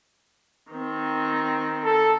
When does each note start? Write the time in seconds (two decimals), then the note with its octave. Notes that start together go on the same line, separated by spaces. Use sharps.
0.70 D#3 C4
1.85 A4